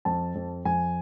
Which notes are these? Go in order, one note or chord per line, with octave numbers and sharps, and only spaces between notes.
F2 A5
F2
F2 G#5